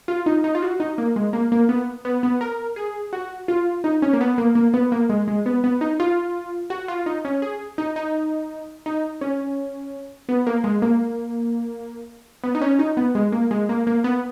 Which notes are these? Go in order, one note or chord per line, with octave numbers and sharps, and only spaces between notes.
F4
D#4
D#4
F4
F#4
D#4
A#3
G#3
A#3
A#3
B3
B3
B3
A#4
G#4
F#4
F4
D#4
C#4
A#3
B3
A#3
A#3
B3
A#3
G#3
G#3
B3
B3
D#4
F4
F#4
F4
D#4
C#4
G#4
D#4
D#4
D#4
C#4
B3
A#3
G#3
A#3
B3
D#4
C#4
D#4
B3
G#3
A#3
G#3
A#3
A#3
B3